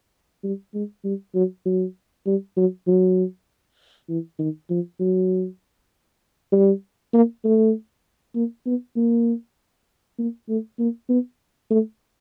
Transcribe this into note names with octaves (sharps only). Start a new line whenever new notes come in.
G3
G#3
G3
F#3
F#3
G3
F#3
F#3
E3
D#3
F3
F#3
G3
A#3
A3
A#3
B3
A#3
A#3
A3
A#3
B3
A3